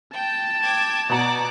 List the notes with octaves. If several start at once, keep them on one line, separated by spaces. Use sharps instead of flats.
G5 A5
G5 D6 G#6
B2 D5 F#5 A#5 D6